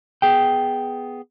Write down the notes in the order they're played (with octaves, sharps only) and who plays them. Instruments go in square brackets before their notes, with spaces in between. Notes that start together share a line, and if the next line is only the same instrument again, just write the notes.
[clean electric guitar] B3 G#4 G5